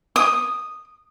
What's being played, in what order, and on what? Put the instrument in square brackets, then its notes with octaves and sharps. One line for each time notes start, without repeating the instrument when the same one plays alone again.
[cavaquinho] D#6